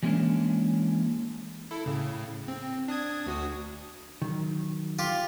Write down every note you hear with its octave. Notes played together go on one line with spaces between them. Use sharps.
E3 G3 G#3 A#3 C#4 D4
E4 A4
A2 C#3
C4
D4 D#6 G#6
D2 F#4 D#6
D#3 F#3
F4 G4